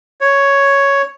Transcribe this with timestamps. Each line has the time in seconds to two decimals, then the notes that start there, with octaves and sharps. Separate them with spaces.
0.21 C#5